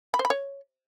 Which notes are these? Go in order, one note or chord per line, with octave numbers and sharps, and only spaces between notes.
B5
C5
B5
C#5